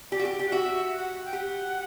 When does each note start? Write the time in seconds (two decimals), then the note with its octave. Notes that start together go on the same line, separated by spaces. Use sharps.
0.11 G4 D5
0.19 F#4
0.25 G4
0.39 G4
0.46 F#5
0.52 F#4 E5
0.93 F#5
1.25 G5
1.33 G4 F#5